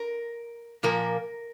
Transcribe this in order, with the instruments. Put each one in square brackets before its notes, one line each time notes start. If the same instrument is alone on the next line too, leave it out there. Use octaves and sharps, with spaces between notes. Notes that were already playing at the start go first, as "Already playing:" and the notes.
Already playing: [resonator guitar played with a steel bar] A#4
A#2 F3 A#3 A#4